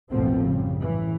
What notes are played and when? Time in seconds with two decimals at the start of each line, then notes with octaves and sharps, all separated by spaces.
0.10 A1 D#2 B2 F3 A3 C4
0.46 F#2 C#3 G3
0.82 A2 E3